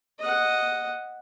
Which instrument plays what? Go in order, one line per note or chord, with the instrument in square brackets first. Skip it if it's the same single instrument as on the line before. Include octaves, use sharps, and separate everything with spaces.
[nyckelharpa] D#5 F#5